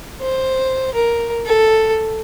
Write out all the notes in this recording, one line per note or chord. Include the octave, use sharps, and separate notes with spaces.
C5
A#4
A4